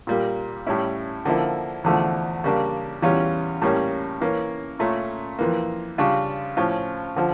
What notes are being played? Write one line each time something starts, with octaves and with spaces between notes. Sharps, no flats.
A#2 G3 A#3
A2 G3 C#4 E4
D3 F3 A#3 E4
E2 D3 F3 A3
C#3 G3 A#3 D4
E2 E3 G3 C#4 F4
A2 G3 A#3 C#4
E3 A#3 C#4
A#2 A3 C#4
F2 E3 A#3
C#3 G3 D4 F4
A2 F3 C#4 F4
D3 F3